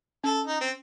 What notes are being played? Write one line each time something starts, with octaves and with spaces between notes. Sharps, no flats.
C#4 A4
D#4
C4